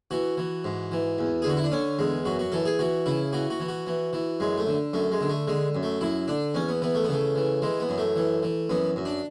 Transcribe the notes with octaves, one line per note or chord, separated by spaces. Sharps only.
E3 F#4
E3
G#2
E3
E2
G#4
D3 F#4
E4
D4
D3 C#4
E2 G#3
F#2 F#4
F#4
E3 A4
G#4
E3 F#4
C#3 E4
E3 F#4
F#4
E3
F#4
E3
E3
F#2 G#3
A3
D3
F#2 A3
G#3
D3
A3
D3 G#3
F#2
A3
F#2 E4
D3 D4
E2 C#4
B3
E3 B3
A3
B3
C#3 A3
E3
E3 G#3
B3
F#2
A3
E3
E3
F#2 B3
F#2
D4